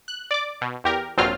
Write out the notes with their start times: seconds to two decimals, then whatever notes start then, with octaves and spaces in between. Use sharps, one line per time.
0.08 F#6
0.31 D5 D6
0.61 B2
0.84 E2 G4 A#4
1.18 A#1 G2 F#3 C4 F4 F6